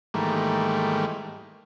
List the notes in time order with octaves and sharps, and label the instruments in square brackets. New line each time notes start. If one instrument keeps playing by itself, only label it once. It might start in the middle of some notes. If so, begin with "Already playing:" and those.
[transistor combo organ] G#2 D#3 E3 G3 A3 A#3